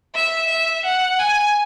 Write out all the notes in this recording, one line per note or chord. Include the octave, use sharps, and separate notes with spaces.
E5
E5
F#5
G#5